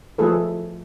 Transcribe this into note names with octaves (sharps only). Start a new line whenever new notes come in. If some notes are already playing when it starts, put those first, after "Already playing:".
F3 A3 G#4 A4 B4